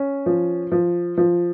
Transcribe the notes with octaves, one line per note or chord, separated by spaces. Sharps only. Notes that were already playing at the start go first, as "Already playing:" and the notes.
Already playing: C#4
F3
F3
F3